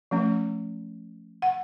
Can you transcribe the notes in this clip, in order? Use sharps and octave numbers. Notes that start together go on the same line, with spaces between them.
F3 A3 C#4
F#5